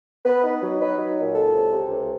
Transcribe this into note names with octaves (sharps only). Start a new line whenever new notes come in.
B3 B4
D#4
F#3
D#4 B4
F#3
A#2
C#2 A4
C3
C3
C#2